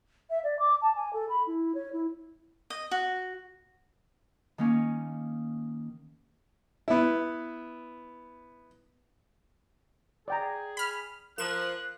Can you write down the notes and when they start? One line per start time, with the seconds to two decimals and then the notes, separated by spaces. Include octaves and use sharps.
0.30 E5
0.44 D5
0.59 D6
0.82 A5
0.96 G#5
1.13 A4
1.29 B5
1.47 E4
1.75 C#5
1.93 E4
2.70 D#5
2.91 F#4
4.58 D#3 A#3 C#4
6.88 B3 E4
10.28 G#4 D5 G5 A#5
10.77 B5 F6
11.38 F3 A#4 F#6 E7